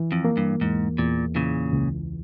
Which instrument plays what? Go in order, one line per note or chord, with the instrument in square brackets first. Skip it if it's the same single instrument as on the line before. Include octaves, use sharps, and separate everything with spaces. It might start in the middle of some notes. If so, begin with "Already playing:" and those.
Already playing: [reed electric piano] E3
[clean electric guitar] F2
[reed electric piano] A#3
[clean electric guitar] G2
[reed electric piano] E2 [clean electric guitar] G#2
[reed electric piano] E2 [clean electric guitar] A#2
[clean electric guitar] A#2 C#3 [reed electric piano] E3
[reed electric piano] C#2